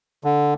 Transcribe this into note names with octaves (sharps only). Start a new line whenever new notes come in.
D3